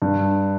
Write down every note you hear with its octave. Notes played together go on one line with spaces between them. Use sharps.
G2